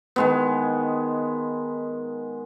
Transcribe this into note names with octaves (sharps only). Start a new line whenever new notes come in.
D#3 G#3 B3